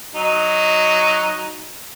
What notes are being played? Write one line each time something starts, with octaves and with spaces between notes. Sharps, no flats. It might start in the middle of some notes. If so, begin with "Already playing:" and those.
F#3 D#4